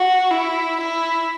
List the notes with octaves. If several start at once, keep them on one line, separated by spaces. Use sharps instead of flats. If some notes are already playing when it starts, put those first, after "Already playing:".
Already playing: F#4
E4
E4